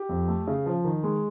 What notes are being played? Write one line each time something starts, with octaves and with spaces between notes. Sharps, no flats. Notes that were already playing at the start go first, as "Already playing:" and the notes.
Already playing: G4
F2
A3
C#3
F3
D#3
G#3